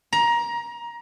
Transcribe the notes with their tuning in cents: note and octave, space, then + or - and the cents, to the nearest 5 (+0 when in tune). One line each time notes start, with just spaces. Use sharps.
A#5 +20